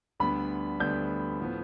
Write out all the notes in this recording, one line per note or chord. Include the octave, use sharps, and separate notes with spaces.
D2 D3 G3 B3 D4 B5
D2 D3 G3 B3 D4 G6
A2 F3 B3